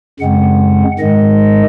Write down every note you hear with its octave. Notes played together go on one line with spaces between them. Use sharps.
F#2 C#3 G#3 C4 F#5
G#2 D#3 G#3 D#5